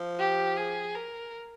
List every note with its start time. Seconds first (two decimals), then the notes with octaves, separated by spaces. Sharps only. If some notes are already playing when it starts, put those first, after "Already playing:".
Already playing: F3
0.19 G4
0.57 G#4
0.94 A#4